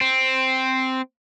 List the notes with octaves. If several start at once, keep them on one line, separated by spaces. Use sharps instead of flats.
C4